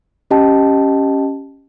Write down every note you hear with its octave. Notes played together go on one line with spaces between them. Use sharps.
C#4 G4 D#5 G5 A5